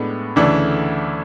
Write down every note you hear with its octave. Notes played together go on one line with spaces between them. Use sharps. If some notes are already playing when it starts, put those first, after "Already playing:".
Already playing: A2 G#3 B3 D4
D2 C#3 E3 A3 D4